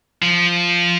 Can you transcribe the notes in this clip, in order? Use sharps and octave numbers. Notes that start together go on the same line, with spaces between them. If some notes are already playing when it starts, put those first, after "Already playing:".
F3